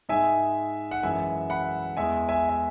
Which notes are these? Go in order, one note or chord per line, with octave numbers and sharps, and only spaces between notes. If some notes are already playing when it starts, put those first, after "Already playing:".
G#2 G#3 E5 G#5
F#5
F#2 E3 G#3 E5 G#5
F#5 B5
E2 E3 G#3 E5 G#5
E5 G#5
E5